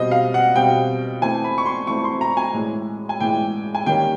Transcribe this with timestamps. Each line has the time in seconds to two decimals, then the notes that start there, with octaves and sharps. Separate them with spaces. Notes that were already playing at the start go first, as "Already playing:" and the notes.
Already playing: B2 G3 C4 D#5
0.11 F5
0.34 F#5
0.56 B2 G3 C4 G5
1.21 E3 A3 C4 G#5
1.44 B5
1.58 C#6
1.66 C6
1.87 E3 A3 C4 C#6
2.04 C6
2.21 A#5
2.37 G#5
2.54 A2 E3 G#3
3.09 G#5
3.20 A2 E3 G#3 G5
3.75 G#5
3.86 D#3 G3 A#3 C#4 G5